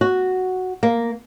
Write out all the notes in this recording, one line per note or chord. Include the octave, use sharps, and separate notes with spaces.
F#4
A#3